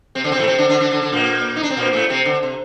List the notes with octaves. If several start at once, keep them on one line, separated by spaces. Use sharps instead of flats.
C3 C4
D3 D4
C3 C4
A2 A3
C3 C4
D3 D4
D3 D4
D3 D4
D3 D4
D3 D4
A#2 A#3
D#4
D4
C4
A#2 A#3
A2 A3
C3 C4
D3
C3